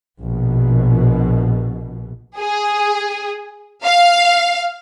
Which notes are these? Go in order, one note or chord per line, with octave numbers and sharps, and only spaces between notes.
A#1 B2
G#4
F5